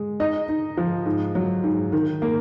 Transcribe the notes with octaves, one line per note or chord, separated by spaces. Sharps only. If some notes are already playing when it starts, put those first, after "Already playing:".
Already playing: G#3
D#4 D#5
D#4
F3
G#2
F#3
G#2
D#3
A#3